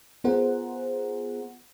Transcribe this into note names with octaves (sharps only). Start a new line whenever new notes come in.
B3 F4 G#4 A#4 C5 F#5